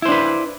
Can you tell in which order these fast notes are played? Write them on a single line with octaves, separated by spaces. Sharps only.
E4 C5 D4 B4